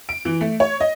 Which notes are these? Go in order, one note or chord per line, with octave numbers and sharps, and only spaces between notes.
D7
E3
A3
C#5
D#5